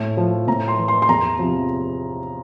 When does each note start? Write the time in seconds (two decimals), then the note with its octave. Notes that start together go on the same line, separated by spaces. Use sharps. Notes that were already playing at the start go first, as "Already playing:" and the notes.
Already playing: A2
0.17 F3
0.48 A2 A#5
0.68 C6
0.78 E3
0.88 C6
1.02 C6
1.09 E2 A#5
1.39 C3 F3